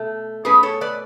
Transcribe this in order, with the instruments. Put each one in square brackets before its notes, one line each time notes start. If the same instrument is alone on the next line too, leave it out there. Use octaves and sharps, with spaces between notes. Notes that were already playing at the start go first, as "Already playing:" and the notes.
Already playing: [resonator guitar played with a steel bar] B2 A3
B2 A3 C#4 G#4 B4
A4 C#5
B4 D5